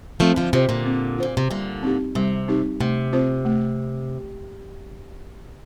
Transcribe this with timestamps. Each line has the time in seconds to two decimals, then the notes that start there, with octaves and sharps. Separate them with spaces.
0.20 F3 A3 C4
0.36 D3 F3
0.53 C3 D#3 F4 C5
0.69 A#2 D3
0.86 C4
1.18 A#2 F4 C5
1.37 C3
1.50 A#2 D3 G3
1.83 C4 D#4 G4
2.15 C3 G3
2.48 C4 D#4 G4
2.81 C3 A3
3.13 C4 F4 C5
3.45 A3